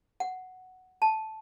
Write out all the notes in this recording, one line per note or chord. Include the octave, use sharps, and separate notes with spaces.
F#5
A5